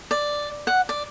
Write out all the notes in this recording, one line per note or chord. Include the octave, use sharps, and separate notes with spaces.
D5
F#5
D5